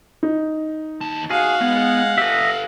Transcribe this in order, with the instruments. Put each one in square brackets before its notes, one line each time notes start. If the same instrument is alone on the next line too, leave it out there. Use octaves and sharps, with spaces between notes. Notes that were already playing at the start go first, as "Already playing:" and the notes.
[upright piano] D#4
[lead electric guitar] D#2 A5
[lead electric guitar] F#4 [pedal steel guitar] G#4 [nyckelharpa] F5 F#5
[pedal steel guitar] G#3 [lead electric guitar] B3
[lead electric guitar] G4 A4 [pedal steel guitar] D#5 E5